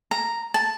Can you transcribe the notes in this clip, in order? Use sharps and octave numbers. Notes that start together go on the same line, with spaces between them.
A#5
A5